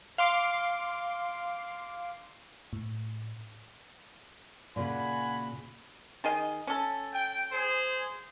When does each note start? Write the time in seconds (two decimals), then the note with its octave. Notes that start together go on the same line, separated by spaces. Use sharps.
0.18 F5 C6 D6 C7
2.73 A2
4.76 A#2 C#3 F#4 G#5 B5
6.24 D#3 G#4 D#5
6.67 C#4 A4
7.14 G5
7.52 G#4 C5